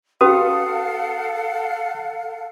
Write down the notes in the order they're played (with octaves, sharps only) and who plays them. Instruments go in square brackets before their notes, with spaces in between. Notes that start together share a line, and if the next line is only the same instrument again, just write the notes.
[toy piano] C#4 F#4 B4 [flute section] A4 F5 F#5 [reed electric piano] D#6